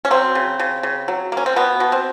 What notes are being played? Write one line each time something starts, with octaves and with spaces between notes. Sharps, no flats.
C#4
F#3 C4
C#3
C#3
C#3
F#3
A#3
C#4
C4
B2 B3
B2
C4